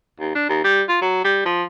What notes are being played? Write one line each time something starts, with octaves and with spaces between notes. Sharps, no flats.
D#2
D4
D#2
G3
F4
F#3
G3
F3